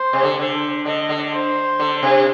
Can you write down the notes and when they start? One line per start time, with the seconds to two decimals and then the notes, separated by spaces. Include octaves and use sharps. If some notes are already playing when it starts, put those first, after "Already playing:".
Already playing: C5
0.13 C3
0.23 D3
0.39 D3
0.85 D3 D#5
1.09 D3
1.32 C5
1.79 D3
2.03 C3